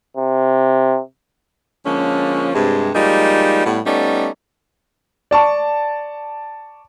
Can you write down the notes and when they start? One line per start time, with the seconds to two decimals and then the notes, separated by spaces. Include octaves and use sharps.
0.17 C3
1.86 D3 F3 G#3 A#3 C#4
2.55 G2 C3 G#3
2.95 F3 G3 G#3 A#3 D#4
3.66 A2 G3 B3
3.87 G3 A3 B3 C#4 D#4 D5
5.31 D5 A5 C#6